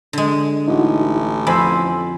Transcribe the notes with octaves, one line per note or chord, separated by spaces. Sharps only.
D3 G#3
A1 D#4 E4 F#4
F2 C5 G#5 B5 C6 E6